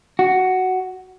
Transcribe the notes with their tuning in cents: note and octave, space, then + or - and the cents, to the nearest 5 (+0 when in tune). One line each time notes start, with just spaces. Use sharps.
F#4 +5